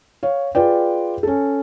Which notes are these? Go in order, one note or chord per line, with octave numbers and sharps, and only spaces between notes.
C#5 F5
F4 G#4 B4 D5 G5
C#4 A4